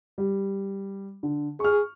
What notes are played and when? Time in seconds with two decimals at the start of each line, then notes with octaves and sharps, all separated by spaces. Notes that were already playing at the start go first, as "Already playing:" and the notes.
0.18 G3
1.23 D3
1.60 G#4 C#6 F6